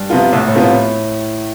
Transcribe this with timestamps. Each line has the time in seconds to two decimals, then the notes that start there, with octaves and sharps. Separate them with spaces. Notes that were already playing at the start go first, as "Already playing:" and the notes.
Already playing: G2
0.10 C3 F3 B3 F4
0.33 C2 A2
0.48 A2
0.55 C3 F3 B3 F4
0.63 A2